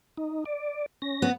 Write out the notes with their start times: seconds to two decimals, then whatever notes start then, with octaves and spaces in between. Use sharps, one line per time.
0.17 D#4
0.46 D5
1.02 C#4 A#6
1.22 B3